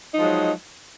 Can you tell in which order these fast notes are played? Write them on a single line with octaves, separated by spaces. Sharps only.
D#4 F3 G#3 F#3